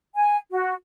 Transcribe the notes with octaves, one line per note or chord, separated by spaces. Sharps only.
G#5
F#4